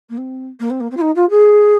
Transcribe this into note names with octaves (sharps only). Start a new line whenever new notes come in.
A#3
C4
A#3
C4
A#3
C4
F4
D#4
F4
G#4